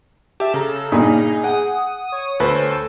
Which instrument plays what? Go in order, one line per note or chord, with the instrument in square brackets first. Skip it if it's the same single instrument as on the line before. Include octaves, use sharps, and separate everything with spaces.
[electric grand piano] G4 E5 [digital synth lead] A5
[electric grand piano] C#3 A#5 [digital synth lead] A4
[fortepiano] G2 A#2 [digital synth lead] D#4 [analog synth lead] G#4
[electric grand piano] F#5 [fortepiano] G5 [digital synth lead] D#6
[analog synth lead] C#5
[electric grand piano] D2 C5 [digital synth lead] A4 [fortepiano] B4